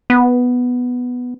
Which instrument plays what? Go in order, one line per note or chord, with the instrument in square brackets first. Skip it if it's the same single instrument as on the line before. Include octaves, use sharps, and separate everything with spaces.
[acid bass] B3